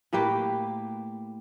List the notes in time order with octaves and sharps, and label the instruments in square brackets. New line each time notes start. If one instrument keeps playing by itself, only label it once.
[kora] A2 A#3 G4 B4